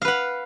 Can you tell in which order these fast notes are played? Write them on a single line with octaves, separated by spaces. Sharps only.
F5 B4 F#5